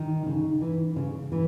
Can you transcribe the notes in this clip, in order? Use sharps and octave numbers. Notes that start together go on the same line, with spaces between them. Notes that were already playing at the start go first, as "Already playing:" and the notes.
Already playing: D#3 D#4
C#3
E3
C#3
E3